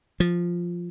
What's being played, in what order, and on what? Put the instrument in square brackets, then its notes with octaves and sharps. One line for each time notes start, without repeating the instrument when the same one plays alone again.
[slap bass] F3